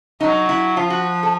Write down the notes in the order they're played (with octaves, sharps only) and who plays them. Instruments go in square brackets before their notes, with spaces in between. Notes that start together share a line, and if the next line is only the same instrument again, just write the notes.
[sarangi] F#3 [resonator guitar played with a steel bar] D#4
[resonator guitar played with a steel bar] E4
[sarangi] F3 [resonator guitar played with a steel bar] F4
[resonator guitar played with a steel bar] F#4
A4